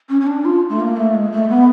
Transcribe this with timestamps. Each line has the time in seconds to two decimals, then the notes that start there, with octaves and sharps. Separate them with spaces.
0.09 C#4
0.21 C#4
0.27 D4
0.45 F4
0.69 A3
0.80 A#3
0.97 A3
1.14 G#3
1.32 A3
1.50 B3